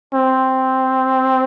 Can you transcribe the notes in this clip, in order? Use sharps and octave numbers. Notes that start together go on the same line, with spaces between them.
C4